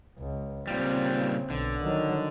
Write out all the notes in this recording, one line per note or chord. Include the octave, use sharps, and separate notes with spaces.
C#2
A#2 C#3 G3 C4
B1 D3
D#3 F#3